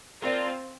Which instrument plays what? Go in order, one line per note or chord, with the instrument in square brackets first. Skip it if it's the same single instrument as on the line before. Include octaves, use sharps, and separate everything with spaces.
[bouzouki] A#3 D4 A#4 [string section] C4 F4